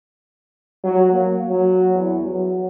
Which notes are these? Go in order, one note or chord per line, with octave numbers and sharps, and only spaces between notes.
F#3
A#3
F#3
E2
F#3